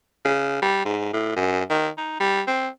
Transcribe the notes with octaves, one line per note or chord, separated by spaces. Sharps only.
C#3
G3
G#2
A2
F#2
D#3
D#4
G3
C4